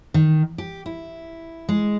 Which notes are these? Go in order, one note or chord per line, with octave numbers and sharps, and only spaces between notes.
D#3
G4
E4
G#3